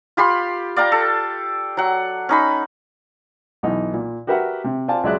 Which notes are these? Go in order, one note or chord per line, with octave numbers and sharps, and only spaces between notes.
F4 G4 B5 C6
D5 F5 G5 A#5
A4
F#3 F#5
C#4 D#4 B5
B1 E3 D#4
A#2
F#4 G4 A#4 B4 E5 F#5
C3
C4 F4 D5 G#5 A5
C#2 F#3 G#3 D5 E5 F#6